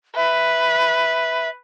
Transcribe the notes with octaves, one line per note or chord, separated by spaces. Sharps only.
B4 E5